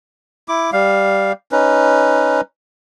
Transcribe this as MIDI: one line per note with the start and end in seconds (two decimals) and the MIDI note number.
0.48 0.71 64
0.48 0.71 86
0.73 1.32 55
0.73 1.32 77
1.52 2.41 61
1.52 2.41 63
1.52 2.41 71